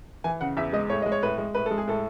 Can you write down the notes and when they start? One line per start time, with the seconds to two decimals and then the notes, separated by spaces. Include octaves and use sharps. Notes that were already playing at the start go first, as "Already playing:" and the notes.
0.24 E3 G#5
0.41 C#3 F#5
0.57 E2 E5
0.73 G#3 D#5
0.90 A2 C#5
1.02 G#3 D#5
1.12 C#5
1.22 A2 B4
1.38 G#3
1.55 A2 B4
1.66 G#3 A4
1.78 G#4
1.87 A2 A4